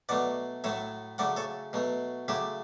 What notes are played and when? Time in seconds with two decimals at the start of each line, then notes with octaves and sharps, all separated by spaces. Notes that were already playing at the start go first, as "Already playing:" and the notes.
0.09 B2 F#3 A3 D5 F#5
0.64 A2 F#3 A3 C#5 E5
1.18 C#3 F#3 A3 D5 F#5
1.36 A4 C#5
1.73 B2 F#3 A3
2.28 C#3 F#3 A3 E4 G4